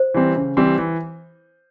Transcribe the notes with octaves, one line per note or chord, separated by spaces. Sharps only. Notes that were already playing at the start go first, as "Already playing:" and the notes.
Already playing: C5
E3 G3 C4
C#3
E3 G3 C4
E3